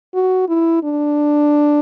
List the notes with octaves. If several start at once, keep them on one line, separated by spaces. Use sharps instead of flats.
F#4
E4
D4